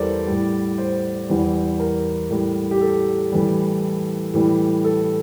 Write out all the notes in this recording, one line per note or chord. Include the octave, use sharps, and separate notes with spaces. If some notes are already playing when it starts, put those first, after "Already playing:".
Already playing: E2 E3 G3 A4 A#4 C5 D5
A2 G3
C5
E2 E3 G3
A#4
A2 G3
G4
A4
A2 E3 G3
A2 E3 G3
A4